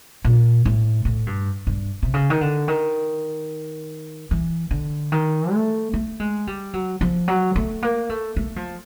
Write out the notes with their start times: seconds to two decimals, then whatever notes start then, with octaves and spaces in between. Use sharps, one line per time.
0.24 A#2
0.65 A2
1.05 A2
1.27 G2
1.67 G2
2.03 C3
2.14 C#3
2.30 D#3
2.41 D3
2.68 D#3
4.31 E3
4.71 D3
5.12 D#3
5.53 A3
5.93 A3
6.20 G#3
6.47 G3
6.74 F#3
7.01 F3
7.28 F#3
7.56 A3
7.83 A#3
8.09 A3
8.36 A3
8.56 F3